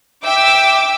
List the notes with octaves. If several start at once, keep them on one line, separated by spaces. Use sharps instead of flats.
E5 G5 D6 E6